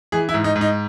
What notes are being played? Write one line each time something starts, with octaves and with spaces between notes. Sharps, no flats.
E3 G#4
E4
G#2
D#4
G#2
D#4